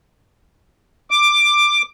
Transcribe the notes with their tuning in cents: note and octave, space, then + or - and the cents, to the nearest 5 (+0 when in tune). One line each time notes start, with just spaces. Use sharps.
D6 +10